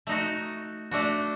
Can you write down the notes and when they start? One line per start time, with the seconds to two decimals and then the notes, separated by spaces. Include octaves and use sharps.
0.07 A3 D#4 F#4
0.91 A3 D4 F#4